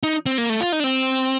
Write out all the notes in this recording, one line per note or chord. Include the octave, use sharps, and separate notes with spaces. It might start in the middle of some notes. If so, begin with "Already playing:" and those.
D#4
C4
A#3
A3
F4
D#4
D4
C4